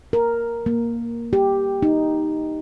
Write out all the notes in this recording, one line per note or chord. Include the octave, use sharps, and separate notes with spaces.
A#4
A#3
G4
D#4